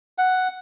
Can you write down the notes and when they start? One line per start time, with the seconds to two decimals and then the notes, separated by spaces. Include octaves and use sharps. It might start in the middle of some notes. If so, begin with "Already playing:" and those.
0.18 F#5